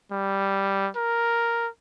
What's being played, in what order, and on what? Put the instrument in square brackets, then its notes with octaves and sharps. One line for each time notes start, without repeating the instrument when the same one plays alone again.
[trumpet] G3
A#4